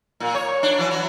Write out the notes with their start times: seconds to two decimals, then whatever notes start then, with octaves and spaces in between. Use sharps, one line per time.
0.20 A#2
0.34 C#5
0.63 D4
0.78 E3 F#3
0.91 F#3